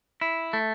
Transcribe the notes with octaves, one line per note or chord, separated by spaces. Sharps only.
E4
A3